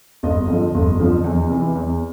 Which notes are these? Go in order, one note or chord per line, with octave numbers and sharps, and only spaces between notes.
G1 D#5
F2 D3 F3
G1
F2 D3 F3
E2
C3 E3
E2